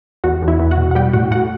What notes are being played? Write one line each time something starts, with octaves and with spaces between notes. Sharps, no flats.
E2 F#4 F#5
E2
E4 E5
E2
F#4 F#5
B2
F#5
G3 G4 G5
A2 F#4 F#5
A2 F#4 F#5